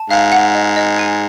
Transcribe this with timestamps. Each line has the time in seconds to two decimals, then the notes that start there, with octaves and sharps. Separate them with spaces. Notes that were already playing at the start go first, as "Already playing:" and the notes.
Already playing: A5
0.10 G#2 F5
0.32 F#5
0.55 D#5
0.77 D#5
0.99 G#5